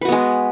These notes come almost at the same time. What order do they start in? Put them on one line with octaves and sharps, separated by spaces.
B4 F#4 B3 G#3